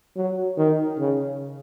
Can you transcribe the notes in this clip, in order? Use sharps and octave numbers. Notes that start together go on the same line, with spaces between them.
F#3
D#3
C#3